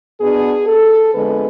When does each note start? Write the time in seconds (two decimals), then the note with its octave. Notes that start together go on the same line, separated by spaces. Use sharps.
0.19 B2 B3 D4 G#4
0.67 A4
1.13 F2 D3 G#3 B3 B4